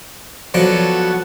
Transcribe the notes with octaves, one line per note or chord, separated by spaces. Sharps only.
F3 F#3 B3 D4 F#4 A4 C#5